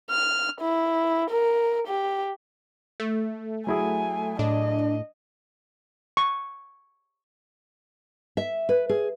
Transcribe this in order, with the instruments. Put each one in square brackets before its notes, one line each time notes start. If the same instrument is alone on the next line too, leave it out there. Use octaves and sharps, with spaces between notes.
[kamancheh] F6
E4
A#4
G4
[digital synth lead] A3
[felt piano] F#3 E4 G#4 [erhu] G#5
[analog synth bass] A2 [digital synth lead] D4 [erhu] D#5
[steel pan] C#6
[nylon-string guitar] E5
B4
G#4